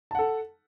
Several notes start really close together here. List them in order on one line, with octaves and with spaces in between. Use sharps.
A5 F#5 A4